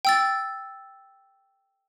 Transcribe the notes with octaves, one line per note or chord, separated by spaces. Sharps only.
G5 E6 A6